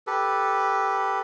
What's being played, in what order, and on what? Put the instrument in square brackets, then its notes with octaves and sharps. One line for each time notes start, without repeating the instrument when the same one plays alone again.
[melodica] G4 A4 B4